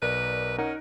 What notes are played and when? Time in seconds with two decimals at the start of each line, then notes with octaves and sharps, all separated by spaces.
0.02 B1 A#4 B4 D5
0.58 C#4 D#4 A#4 F#5